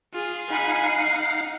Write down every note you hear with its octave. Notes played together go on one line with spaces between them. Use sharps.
F4 G#4
D#4 F5 F#5 G#5 B5
C7